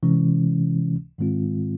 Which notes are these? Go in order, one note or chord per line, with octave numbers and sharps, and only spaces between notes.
C3 E3 G#3 C#4
G#2 D#3 G#3 C4 F4